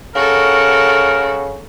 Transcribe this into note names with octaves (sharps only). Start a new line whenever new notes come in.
C#3 F#4 A4 A#4